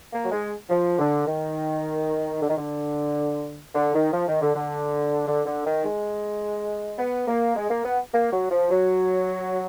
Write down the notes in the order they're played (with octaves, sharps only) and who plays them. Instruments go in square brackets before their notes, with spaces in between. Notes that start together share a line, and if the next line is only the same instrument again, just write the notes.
[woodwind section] A#3
F#3
G#3
F3
D3
D#3
D3
D#3
D3
D3
D#3
F3
D#3
D3
D3
D3
D3
D#3
G#3
B3
A#3
G#3
A#3
B3
A#3
F#3
F3
F#3